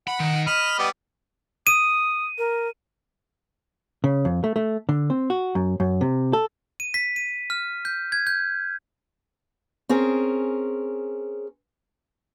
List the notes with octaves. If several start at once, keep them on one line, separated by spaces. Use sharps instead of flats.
F#5 B5
D#3
D#5 B5 F6
G3 B3
D#6 D#7
A#4
C#3
F2
A3
A3
D3
C4
F#4
F#2
F#2
C3
A4
D#7
B6
D#7
F6
G6
G#6
G6
C4 C#4 G#4 A#4